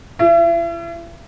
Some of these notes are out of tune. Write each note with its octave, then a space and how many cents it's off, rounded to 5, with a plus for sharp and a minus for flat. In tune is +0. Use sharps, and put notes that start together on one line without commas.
E4 +40